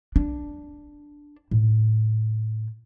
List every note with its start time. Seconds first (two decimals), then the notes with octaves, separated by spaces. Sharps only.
0.16 D4
1.51 A2